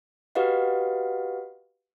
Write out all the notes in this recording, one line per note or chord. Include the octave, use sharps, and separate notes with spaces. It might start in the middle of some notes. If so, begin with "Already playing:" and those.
F#4 G4 B4 D#5 F5 F#5